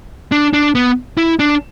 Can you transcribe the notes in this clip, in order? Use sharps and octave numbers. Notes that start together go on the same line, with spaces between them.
D4
D4
B3
E4
D4